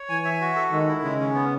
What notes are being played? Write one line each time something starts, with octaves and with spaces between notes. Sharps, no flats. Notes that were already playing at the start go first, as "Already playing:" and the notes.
Already playing: C#5
E3 G#5
E5
F#4
A4
D#3 G#3
E4
C#3 G#3
C#4
B3